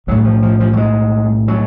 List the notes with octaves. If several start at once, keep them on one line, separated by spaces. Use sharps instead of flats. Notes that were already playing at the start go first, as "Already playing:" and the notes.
B1 A2 F#3
F3
F3
F3
F#3
G#3
F#3